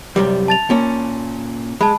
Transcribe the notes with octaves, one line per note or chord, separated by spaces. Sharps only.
C2 F#2 G3
A5 A6 F7
A#2 C#4
G#3 A5 B5